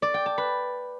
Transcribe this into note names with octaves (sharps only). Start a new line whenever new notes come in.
D5
G5
A5
B4